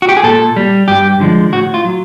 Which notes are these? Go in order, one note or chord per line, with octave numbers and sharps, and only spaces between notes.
F#4
G4
G#4
A#2 A4
G3
G2 G4
D3 F3 G#3
A2 F#4
F4
F#3